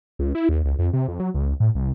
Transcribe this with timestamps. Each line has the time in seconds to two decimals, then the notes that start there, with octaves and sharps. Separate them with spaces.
0.19 C#2
0.35 E4
0.49 D#2
0.64 C#2
0.79 F2
0.93 C3
1.08 F2
1.20 F#3
1.35 C#2
1.60 A2
1.75 C2